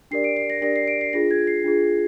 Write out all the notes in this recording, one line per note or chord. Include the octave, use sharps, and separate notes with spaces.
D4 G4 A#4 D5 C7
D7
C7
A#6
D4 G4 A#4 D5 A#6
C7
D7
C7
D4 F4 G#4 A#6
G#6
C7
D4 F4 G#4